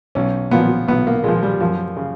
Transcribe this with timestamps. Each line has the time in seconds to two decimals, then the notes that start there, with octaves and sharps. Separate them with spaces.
0.15 B1 C#4
0.51 A#2 F3 B3
0.87 B1 B3
1.07 A#3
1.24 A#2 F3 G#3
1.43 G3
1.60 F#2 F3
1.97 C#3